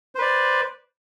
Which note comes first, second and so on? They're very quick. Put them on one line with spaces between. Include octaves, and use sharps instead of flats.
C5 B4 D5